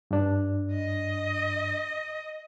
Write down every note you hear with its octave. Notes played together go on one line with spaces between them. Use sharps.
G2 D4
D#5